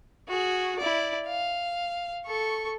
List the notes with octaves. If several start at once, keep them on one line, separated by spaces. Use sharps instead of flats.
F#4 G#4
E4 D5
F5
A4 C#6